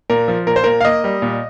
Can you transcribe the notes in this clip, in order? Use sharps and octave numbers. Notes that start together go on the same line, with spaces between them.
A#2 A#4
F3
A#2 A#4
C5
A#2 A#4
F5
A#3 D#5
G3
A#2